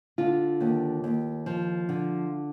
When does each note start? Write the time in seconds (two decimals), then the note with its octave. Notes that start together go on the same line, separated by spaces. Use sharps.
0.18 D3 F4
0.61 D#2
1.04 D#2
1.46 F3
1.89 D3